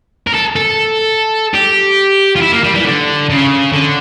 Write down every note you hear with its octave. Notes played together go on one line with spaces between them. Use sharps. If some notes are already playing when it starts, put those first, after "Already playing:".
A#4
A4
A4
G4
F4
E4
A#3
G3
E3
D3
C#3
D3